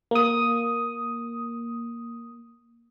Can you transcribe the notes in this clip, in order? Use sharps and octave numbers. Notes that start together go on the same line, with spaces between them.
A#3 D#6